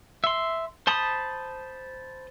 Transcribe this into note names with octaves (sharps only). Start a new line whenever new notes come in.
E5 C6
C5 A5 B5 D#6